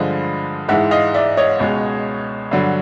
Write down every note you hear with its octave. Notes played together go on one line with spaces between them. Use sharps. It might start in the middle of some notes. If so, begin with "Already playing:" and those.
Already playing: G2 D3 F3 G#3 D#5
G#2 E3 G#3 E5 F#5
D#5 F5
D5 E5
C#5 D#5
C#2 B2 G#3
G2 D3 F#3